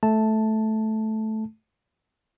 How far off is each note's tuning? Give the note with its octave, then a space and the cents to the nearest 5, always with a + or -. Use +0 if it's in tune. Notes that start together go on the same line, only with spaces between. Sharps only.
A3 -10 A5 +0